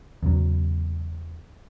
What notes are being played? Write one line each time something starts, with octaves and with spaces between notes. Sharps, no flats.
E2 C#3 F#3